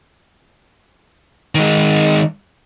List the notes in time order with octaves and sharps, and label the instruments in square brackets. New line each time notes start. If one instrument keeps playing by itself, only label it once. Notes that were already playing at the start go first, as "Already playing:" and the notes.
[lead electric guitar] D#3 G#3